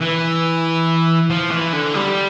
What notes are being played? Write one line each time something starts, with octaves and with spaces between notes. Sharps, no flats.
E3
F3
E3
D3
G3